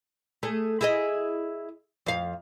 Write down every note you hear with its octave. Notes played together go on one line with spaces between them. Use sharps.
A3 G#4
E4 G#4 D#5
F2 F5